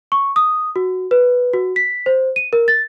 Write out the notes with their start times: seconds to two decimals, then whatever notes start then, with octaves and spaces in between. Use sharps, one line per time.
0.12 C#6
0.36 D#6
0.76 F#4
1.11 B4
1.53 F#4
1.76 B6
2.06 C5
2.36 D#7
2.53 A#4
2.68 A6